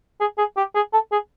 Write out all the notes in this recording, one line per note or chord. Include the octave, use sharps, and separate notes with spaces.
G#4
G#4
G4
G#4
A4
G#4